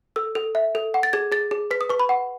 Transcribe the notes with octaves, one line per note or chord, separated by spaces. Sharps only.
A4 E6
A4
E5
A4
F#5
A6
G#4 G#6
G#4 A6
G#4
B4 B6
D#6
B4 C#6
B5
F#5